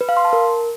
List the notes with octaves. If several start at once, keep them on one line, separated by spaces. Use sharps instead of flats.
B4
F5
C6
A5
A#4